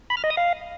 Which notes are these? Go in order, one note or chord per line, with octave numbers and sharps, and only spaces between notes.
B5
F6
D#5
D#6
F5